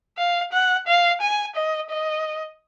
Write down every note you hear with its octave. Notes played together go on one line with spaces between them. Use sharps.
F5
F#5
F5
G#5
D#5
D#5